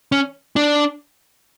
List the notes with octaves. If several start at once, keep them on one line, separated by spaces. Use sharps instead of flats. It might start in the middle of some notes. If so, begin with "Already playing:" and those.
C#4
D4